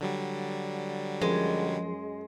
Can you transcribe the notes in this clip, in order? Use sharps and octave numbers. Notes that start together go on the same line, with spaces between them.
D3 F#3 G3
F#2 F3 G#3